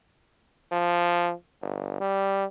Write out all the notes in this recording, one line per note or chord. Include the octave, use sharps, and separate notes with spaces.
F3
G1
G3